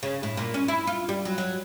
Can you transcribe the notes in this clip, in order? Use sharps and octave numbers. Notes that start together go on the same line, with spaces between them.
C#3
A2
A#2
C#4
E4
F4
G3
F#3
F#3